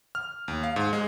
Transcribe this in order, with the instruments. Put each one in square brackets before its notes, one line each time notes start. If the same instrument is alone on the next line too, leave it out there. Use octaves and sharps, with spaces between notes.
[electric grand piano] F6
D#2
F5
G#2
G#3